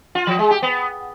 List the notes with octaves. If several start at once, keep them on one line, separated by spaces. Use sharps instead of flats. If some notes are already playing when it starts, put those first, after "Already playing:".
F4
F3
G#3
G4
B3